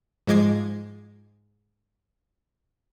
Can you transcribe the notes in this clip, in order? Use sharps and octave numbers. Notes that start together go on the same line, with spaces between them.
G#2 F3 G#3 D6 G#6 C7